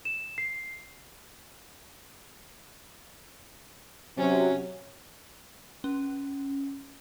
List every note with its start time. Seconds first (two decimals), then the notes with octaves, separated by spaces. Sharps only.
0.05 E7
0.38 C7
4.18 C3 F#3 C#4
5.84 C#4